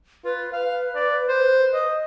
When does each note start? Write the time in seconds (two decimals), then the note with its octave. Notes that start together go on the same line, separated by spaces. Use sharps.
0.25 F4 B4
0.53 B4 F5
0.95 D5
1.29 C5
1.74 D#5